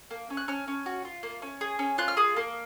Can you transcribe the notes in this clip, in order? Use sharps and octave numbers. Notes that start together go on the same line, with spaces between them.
A#3
C#4
F#6
C#4 F6
C#4
F#4
F4
A#3
C#4
G#4
C#4
F4 F#6
F6
G#4 D#6
A#3